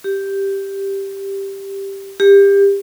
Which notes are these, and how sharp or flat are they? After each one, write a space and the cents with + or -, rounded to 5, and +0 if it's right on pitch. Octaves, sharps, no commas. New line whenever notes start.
G4 +0
G4 +25